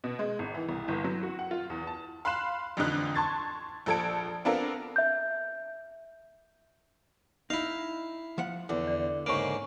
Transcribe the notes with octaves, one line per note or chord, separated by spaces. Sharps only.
B2
G#3
G#1
E3
C2
G1
F#3
F#4
F#5
F4
E2
A5
F5 B5 C6 F#6 E7
A1 F2 D3 D#4 F#6
A5 C6 C#6 G#6 A6
A#1 F3 A4 A5 G#6 D7
B3 C4 D4 F4 A4 A#4
E5 G6
D#4 E4 F5
F3 F#5
E2 D3
D5
G#2 C#3 A#3 C#6 D7